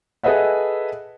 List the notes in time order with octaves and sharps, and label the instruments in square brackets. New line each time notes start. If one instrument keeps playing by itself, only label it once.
[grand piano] G#4 A4 B4 D#5 E5 F#5